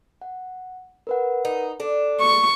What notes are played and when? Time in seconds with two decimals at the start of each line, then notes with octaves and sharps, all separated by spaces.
0.22 F#5
1.07 A#4 B4 F#5
1.45 D#4
1.80 D4 A4
2.21 C#6